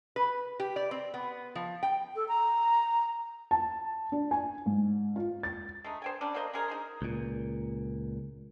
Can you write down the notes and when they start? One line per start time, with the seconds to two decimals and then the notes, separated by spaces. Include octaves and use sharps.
0.16 B4
0.60 G4
0.76 D5
0.91 C4
1.14 B3
1.55 F3
1.83 G5
2.16 A4
2.28 A#5
3.51 A5
4.12 D4
4.31 G#5
4.66 G#2
5.16 F4
5.43 A6
5.84 G#3 A3 D#4
6.02 C5 G5 G#5
6.21 F#3 G3 C#4 D4
6.34 F#3 A#3 C5 D#5
6.53 F#3 G#3 G#4 A#4
6.68 D#4 C5 C6
7.02 C#2 A#2